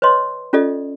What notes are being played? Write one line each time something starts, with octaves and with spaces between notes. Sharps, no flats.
B4 C#5 D#5 C6
C#4 F4 A4 D5 D#5